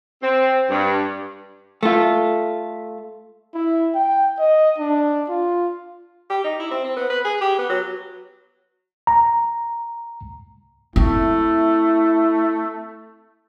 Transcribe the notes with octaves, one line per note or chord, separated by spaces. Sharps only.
C4
G2
A3 F4
E4
G5
D#5
D4
F4
G4
D#4
E4
C4
C4
B3
B4
G#4
G4
B3
F#3
A#5
A3 C4 E4